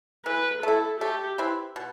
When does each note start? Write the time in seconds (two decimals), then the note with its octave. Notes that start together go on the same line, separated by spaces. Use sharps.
0.25 E3 B4
0.63 A3 E4 A4
1.01 A3 G4
1.38 C4 E4 B4
1.76 B2